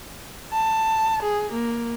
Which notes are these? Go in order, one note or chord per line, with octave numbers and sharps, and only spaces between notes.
A5
G#4
A#3